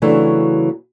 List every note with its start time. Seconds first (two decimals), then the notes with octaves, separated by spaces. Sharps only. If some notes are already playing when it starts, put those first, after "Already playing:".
0.02 C#3 E3 F#3 A3 D4